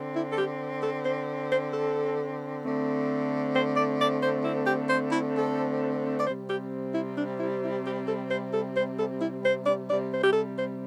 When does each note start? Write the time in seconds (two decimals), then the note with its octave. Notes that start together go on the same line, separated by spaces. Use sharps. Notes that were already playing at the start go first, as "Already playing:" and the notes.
Already playing: D3 C4
0.13 E4
0.32 A4
0.36 G4
0.81 A4
1.04 C5
1.50 C5
1.72 A4
2.63 D3 A3 C4
3.54 C5
3.77 D5
3.98 D5
4.21 C5
4.44 E4
4.66 G4
4.89 C5
5.12 E4
5.35 A4
6.18 D5
6.25 C3 G3 C4 C5
6.48 G4
6.93 E4
7.16 D4
7.39 E4
7.62 E4
7.85 G4
8.06 A4
8.30 C5
8.52 A4
8.74 C5
8.97 A4
9.20 E4
9.44 C5
9.65 D5
9.88 C3 G3 C4 D5
10.11 C5
10.23 G4
10.33 A4
10.56 C5